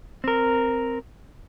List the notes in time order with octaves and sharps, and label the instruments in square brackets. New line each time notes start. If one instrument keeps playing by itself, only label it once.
[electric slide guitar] C4 A#4